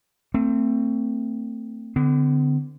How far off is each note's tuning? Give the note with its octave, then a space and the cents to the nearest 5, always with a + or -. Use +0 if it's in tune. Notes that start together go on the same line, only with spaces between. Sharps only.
A3 +35 C4 +0
D3 +0 B3 +45